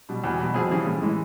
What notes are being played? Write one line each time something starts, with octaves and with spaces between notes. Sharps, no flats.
B2 G3
E2
B2 G3
F2 G#4
C#3 E3 G3 G#4
A2
E3 G#3